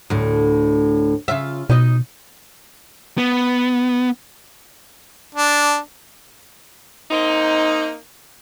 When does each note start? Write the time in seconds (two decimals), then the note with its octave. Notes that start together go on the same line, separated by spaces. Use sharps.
0.10 D2 A2
1.28 C#3 F4 E5
1.70 B2 D#4 D#5
3.18 B3
5.35 D4
7.10 A#3 C4 D#4